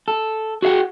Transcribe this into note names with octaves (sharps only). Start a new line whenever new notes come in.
A4
F#4 G#4 E5 F#5 G5